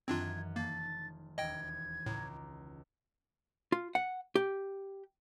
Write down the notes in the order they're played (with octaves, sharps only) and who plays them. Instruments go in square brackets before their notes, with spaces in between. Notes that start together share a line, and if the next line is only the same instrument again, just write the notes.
[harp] F#2 D#3 E3 [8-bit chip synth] C4 D4 F4 [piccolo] G#6
[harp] F1 A5 [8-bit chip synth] A#3 [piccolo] A6
[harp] E1 D#2 [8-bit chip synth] D#5 G5 [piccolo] G#6
[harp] C#2 A#5 D6 [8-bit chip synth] A2
[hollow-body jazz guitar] F4
F#5
G4